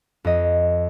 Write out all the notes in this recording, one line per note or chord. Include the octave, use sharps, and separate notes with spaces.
F2 D#5